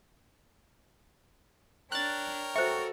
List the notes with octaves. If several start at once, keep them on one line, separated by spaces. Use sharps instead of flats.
D4 A#4 C#5 G5 F#6 A6
F#4 A4 C5 E5 C#6